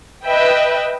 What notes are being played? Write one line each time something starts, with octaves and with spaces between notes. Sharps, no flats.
B4 D#5 E5 G5